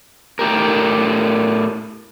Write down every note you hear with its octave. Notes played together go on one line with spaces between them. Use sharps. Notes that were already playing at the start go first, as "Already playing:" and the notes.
A2 G4 A#4